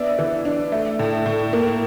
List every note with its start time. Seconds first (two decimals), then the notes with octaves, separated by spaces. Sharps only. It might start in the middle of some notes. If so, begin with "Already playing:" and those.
Already playing: B3 D4 D5 E5
0.19 E3
0.45 D4
0.72 A3
0.99 A2
1.26 A2
1.53 A#3